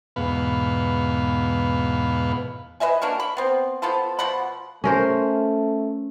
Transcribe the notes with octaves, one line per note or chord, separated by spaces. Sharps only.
E2 G#2 B2 B3 B4 F5
B4 D#5 E5 G#5
A#3 D4 F#4 A#4
B5
B3 C4
F3 B3 F4 A4
B2 F3 F#5 B5
A3 C#4 A#4 C5